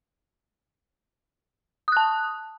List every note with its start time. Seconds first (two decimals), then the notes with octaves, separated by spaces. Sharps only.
1.88 D#6
1.92 F#6
1.97 A5